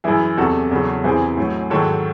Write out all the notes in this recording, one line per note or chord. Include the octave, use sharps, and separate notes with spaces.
F#2 E3 E4 G#4
E2 C3 F#3 F#4 A4
E2 C#3 F#3
E2 C3 E3 G#4 C5
A2 F#3
G#2 D#3 F#3 A4 C#5